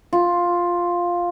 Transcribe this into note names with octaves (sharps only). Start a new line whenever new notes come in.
F4